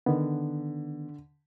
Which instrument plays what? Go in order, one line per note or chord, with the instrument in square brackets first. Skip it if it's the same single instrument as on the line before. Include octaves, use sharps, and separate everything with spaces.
[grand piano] D3 [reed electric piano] D#3 B3